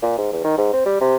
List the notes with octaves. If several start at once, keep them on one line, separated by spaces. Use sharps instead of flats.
A#2
G#2
E2
D#3
G#2
C4
G3
C3